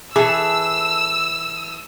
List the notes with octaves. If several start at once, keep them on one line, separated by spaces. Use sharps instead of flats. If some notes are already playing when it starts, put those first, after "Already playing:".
E3 G#4 A4 E6